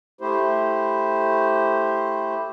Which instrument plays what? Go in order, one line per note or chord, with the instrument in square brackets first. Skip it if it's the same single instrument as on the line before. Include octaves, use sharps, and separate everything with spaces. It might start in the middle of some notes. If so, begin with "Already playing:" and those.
[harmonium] A3 E4 G4 C5